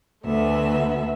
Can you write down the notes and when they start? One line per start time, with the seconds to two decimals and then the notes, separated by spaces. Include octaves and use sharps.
0.25 D2 A3 B3 E5